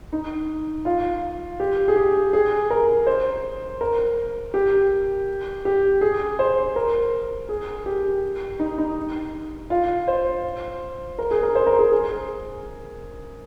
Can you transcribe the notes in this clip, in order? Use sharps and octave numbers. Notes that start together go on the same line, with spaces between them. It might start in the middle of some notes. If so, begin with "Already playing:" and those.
D#4
F4
G4
G#4
G4
G#4
A#4
C5
A#4
G4
G4
G#4
C5
A#4
G#4
G4
D#4
D#4
F4
C5
A#4
G#4
A#4
C5
A#4
G#4
G#4